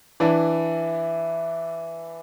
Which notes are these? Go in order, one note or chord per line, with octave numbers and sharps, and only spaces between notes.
E3 D4 E4